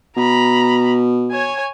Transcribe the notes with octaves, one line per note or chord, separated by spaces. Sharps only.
B2 A#5 B5
C#5 G#5